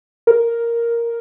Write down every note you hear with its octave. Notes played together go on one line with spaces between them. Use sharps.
A#4